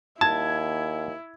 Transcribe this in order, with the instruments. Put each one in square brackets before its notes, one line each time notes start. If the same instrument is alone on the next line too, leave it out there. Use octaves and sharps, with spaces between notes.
[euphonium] D#2 [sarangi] E4 [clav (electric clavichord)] A5 [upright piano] G#6